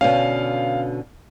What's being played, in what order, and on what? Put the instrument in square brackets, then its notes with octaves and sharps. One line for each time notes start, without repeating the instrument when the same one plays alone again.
[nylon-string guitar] B2 D3 C#4 [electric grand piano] F5